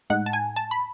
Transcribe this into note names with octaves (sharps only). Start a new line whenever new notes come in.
A2 G#3 D#4 F#5
A5
G#5
A5
B5